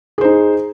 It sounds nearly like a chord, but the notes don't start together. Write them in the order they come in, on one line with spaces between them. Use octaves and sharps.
G#4 C5 D#4